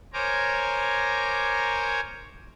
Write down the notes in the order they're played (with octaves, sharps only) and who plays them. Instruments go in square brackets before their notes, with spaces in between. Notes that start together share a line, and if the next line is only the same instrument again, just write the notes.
[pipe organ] A#4 C5 C#5 G#5 A#5 D6